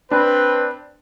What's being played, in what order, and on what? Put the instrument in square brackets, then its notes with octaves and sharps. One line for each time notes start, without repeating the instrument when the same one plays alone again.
[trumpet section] C4 B4 [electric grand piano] D4